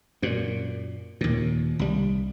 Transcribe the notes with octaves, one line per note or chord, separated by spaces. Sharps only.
F#2 A#2
D#2 A#2
C2 G3